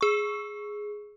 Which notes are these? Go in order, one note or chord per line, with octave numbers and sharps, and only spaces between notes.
G#4 C#6